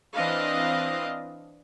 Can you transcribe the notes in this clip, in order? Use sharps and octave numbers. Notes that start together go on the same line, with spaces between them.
E3 C4 D4 D#5 F5